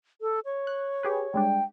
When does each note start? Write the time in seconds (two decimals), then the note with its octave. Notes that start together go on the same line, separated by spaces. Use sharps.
0.21 A4
0.45 C#5
0.67 F#6
1.03 G4 G#4 B4
1.34 G3 G#3 D4 G5